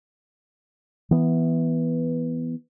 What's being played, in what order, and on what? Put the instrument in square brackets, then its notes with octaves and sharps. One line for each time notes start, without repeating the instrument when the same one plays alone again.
[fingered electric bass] E3 B3